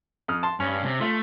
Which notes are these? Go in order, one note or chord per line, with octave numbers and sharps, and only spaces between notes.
F2 D#6 F6
A5 C6
G2 C#4
C3
A3 F4